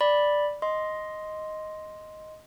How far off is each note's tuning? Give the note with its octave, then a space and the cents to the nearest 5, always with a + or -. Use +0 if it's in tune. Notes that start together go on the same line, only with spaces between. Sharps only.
D5 +0 B5 -5
D#5 +5 C6 +0